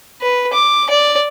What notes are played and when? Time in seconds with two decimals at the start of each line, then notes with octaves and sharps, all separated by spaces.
0.21 B4
0.53 D6
0.90 D5